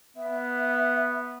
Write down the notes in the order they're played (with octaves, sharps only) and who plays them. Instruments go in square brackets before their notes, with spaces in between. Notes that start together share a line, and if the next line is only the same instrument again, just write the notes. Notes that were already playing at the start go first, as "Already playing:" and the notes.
[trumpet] B3 [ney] E5